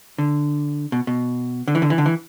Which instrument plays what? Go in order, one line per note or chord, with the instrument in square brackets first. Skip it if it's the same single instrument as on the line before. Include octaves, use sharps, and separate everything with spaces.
[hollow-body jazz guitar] D3
B2
B2
D3
E3
D3
E3
D3
E3